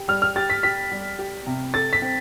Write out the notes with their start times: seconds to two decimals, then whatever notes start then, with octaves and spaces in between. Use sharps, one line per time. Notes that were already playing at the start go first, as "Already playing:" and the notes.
Already playing: G4
0.08 G3 F6
0.22 F6
0.36 G4 A6
0.50 B6
0.63 G4 B6
0.92 G3
1.19 G4
1.47 C3
1.74 A4 A6
1.93 B6
2.02 C4